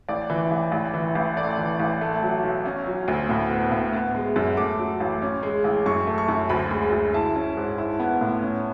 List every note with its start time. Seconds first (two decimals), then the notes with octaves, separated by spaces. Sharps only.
0.08 A1 D5
0.30 E3
0.51 A1
0.72 A1
0.94 E3
1.15 A1
1.37 A3 D5
1.58 E3
1.79 A1
2.01 A3
2.22 F#3
2.44 B1
2.65 C#4
2.86 F#3
3.08 D2
3.29 A2
3.51 B3
3.72 A2
3.93 B3
4.15 G#3
4.36 F#2
4.57 A3 D6
4.79 F#3
5.00 A1
5.22 C#4
5.43 G#3
5.64 A1
5.86 F#2 C#6
6.07 A3
6.18 C#6
6.28 F#2
6.49 D2 B5
6.71 G#3
6.92 D2
7.14 E4 A5
7.36 C#4
7.57 G#2
7.78 E4
8.00 B3
8.21 A2
8.42 C#4